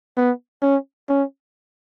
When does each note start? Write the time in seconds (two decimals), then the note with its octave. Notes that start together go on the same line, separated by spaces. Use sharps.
0.17 B3
0.62 C#4
1.09 C#4